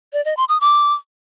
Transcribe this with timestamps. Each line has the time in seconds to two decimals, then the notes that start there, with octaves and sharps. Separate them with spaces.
0.13 D5
0.25 D#5
0.37 C6
0.49 D#6
0.61 D6